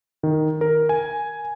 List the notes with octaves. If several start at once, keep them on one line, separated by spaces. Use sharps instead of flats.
D#3
A#4
G#5